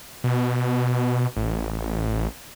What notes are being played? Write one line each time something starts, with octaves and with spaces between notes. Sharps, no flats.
B2
A1